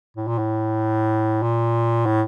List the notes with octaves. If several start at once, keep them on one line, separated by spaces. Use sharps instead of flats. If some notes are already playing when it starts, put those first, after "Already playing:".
A2
A#2
A2
A#2
A2